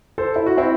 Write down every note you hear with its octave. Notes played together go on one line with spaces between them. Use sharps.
A4 C5
E4
F#4
C4 E4